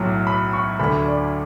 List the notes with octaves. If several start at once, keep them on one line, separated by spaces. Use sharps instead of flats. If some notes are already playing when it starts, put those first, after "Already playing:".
Already playing: B1 A2 F#3 A3
B5
C#6
D2 D3 A3 B5
D5